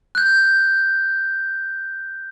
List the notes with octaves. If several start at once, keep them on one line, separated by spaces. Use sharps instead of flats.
F#6 G6